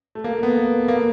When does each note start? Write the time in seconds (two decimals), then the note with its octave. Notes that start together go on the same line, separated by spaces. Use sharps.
0.15 A3
0.24 A#3
0.43 B3
0.88 A#3